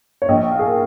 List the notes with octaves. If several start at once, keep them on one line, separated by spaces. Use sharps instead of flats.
C#5
A#1 D#5
F5
G#4
A#4